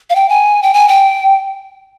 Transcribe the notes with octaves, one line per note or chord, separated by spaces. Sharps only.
F5
G5
G#5
G5
G#5
G5